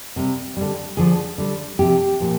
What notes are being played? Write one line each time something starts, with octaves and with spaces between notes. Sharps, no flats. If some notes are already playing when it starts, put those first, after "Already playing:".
C3 G3
D3 G3
D3 F3 G#4
D3 G3
C3 F3 G4
A#2 F3